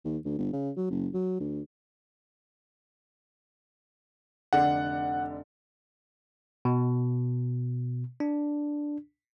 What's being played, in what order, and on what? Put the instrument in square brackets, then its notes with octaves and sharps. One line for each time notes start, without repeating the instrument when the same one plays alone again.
[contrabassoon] D#2
D2
G1
C#3
F#3
F#1
F#3
D2
[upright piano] F1 D3 D5 [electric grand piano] F#5
[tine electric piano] B2
D4